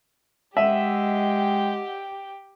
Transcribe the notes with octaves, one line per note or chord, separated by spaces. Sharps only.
G#3 G4 D#5 E5 F#5 G5